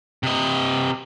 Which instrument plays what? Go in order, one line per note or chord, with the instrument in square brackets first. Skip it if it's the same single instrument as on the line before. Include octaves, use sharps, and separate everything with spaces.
[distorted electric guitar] C3 D#5